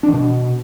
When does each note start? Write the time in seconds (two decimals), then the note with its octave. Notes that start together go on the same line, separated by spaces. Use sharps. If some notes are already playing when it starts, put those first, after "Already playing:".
0.03 D4
0.08 E3
0.13 B2